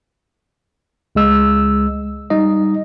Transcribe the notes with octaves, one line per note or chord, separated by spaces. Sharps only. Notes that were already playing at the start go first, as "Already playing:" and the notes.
C#2 G#3 E6
G3 D#4 D#5